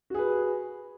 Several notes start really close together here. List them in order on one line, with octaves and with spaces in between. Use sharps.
F#4 G#4 B4